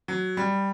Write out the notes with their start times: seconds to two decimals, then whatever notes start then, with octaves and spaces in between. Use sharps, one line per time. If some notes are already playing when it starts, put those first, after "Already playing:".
0.08 F#3
0.37 G3